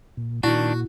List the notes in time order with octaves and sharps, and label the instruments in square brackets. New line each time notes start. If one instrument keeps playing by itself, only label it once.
[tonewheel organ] A#2
[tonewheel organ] A#2 [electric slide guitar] D#3 D4 [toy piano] E4 [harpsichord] F#4